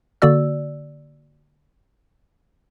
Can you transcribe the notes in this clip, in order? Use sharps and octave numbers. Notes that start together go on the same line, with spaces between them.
D3 A#3 F#4 D5 E6